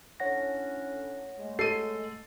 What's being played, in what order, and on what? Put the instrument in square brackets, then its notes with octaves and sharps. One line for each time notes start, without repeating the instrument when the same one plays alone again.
[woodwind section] A2 C#4 D4 [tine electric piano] C#5 F#5 A#6
[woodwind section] G#3 A3
[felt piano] A4 [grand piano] C7 D#7